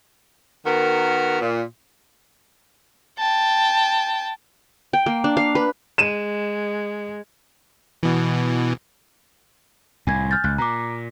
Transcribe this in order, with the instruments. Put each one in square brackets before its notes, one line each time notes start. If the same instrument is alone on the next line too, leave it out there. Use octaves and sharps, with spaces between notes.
[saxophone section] D#3 B3 F#4 A#4
A#2
[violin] G5 A5
[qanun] G5
A#3
D4
F5
B4
[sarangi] G#3 [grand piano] D#7 E7
[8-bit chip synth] B2 E3
[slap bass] C2 A2 [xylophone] G#5 G#6
[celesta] F6 G6 A6
[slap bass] C#2 [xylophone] F#6
[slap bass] A#2 [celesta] A#5 D6